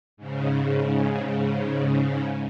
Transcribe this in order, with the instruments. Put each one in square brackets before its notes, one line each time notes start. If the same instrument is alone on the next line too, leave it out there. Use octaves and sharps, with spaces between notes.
[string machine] G#2 C#3